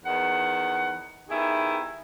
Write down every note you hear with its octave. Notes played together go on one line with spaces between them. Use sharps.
E2 D#3 F#5
D#3 B3 E4 G4 G#4